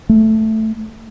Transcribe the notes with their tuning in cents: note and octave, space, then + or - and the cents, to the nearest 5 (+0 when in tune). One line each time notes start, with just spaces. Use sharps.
A3 +0